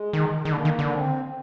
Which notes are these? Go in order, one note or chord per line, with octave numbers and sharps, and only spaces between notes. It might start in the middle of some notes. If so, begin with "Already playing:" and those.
Already playing: G#3
D#3
D#3
D3 A#3
D#3
D3
C4